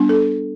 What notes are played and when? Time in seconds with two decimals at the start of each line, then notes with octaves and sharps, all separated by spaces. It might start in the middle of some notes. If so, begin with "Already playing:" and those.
Already playing: G3 B3 D4
0.09 A4